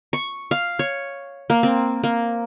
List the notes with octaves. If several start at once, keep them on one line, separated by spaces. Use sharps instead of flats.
C#6
F5
C#5
A#3
C4
A#3